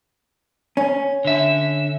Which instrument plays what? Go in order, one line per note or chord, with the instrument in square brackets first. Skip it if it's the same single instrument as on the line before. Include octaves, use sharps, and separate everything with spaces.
[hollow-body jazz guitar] C#4
[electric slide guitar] D3 E5